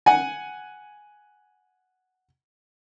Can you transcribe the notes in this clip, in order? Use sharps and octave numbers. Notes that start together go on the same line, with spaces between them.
F#5 G#5